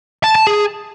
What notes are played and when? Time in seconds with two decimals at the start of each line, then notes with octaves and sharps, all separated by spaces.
0.24 A5
0.35 A5
0.47 G#4